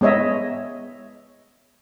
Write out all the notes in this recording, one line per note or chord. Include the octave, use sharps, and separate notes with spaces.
G#3 B3 C#5 D#5 E5